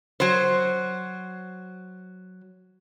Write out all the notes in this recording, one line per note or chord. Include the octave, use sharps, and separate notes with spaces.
F#3 C5